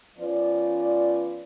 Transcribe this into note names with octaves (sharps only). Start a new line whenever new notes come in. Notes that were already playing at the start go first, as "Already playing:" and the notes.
F3 B3 C#4 D5